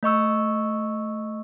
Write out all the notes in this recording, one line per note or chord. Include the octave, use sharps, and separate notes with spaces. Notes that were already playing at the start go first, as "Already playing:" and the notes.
A3 D#5 C#6 E6